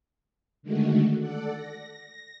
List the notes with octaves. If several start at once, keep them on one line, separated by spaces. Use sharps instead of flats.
D3 D#3 G#3 A3 F#4
A4 D5 F#5
A#6